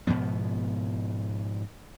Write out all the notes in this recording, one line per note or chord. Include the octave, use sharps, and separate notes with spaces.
G#2 B2 F3 B3